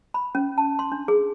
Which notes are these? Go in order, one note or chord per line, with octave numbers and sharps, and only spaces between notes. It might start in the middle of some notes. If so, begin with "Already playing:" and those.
B5
C#4
A5
C6
D4
G#4